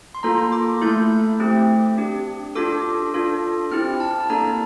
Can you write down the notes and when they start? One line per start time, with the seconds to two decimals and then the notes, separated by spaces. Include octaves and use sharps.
0.15 C6
0.23 A#3 F4 A4 A#5
0.52 D6
0.82 A3 E4 A4 G6
1.40 A3 C4 G4
1.98 D4 G4
2.55 D4 F4 A4 D6
3.14 D4 F4 A4
3.72 C4 E4 G4 F6
4.00 A5
4.15 A5
4.30 A#3 D4 A4 A#5